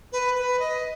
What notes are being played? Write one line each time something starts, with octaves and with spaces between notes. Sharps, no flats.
B4
B4
D#5